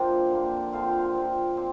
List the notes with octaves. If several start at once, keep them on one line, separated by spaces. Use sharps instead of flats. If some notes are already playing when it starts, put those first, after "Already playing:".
Already playing: C3 F3 A#3 C4 D4 G4 C5
D3 A#3
D3 F3 C4 F5
G5
F5
C3 F3 C4
C4 D5